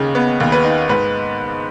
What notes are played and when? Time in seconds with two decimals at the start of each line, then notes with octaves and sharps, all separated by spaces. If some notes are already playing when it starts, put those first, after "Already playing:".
Already playing: D#2 C#3 D#4
0.15 B3
0.40 D#2
0.52 B4
0.64 D#4
0.89 G#2 B4